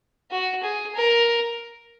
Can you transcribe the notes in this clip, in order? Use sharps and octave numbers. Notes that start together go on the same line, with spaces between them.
F#4
G#4
A#4